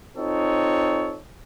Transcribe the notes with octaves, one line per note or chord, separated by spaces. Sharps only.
C4 D#4 F4 A4 C#5